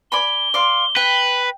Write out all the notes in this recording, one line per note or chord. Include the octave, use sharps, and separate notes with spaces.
D5 G#5 B5 G7
D5 F5 C6
B4 G5